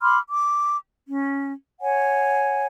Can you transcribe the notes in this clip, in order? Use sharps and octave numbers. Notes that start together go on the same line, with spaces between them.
B5 C6 D6 F6
D6
C#4
C#5 F#5 G#5